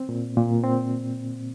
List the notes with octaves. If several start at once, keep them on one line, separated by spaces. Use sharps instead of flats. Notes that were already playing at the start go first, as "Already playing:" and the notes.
Already playing: C4
A#2
A#2
C4